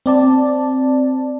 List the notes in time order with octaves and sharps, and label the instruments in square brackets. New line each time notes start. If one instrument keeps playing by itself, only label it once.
[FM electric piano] C4 D5 A5